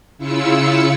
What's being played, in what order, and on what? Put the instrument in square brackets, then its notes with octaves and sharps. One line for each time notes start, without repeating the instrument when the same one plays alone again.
[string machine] C#3 E4 F4 E6 C#7